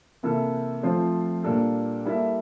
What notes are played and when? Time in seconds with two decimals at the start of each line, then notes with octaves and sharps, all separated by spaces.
0.23 C3 E3 A#3 E4 A4
0.83 F3 A3 C4 F4 C5
1.44 A#2 G3 A#3 D4 A4
2.05 G3 A#3 E4 A4 E5